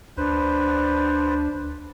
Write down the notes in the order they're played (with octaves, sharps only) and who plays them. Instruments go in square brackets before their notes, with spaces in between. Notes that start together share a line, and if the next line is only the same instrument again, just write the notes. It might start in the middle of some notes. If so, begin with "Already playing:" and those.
[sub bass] D2 [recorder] D4 [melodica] B4 C5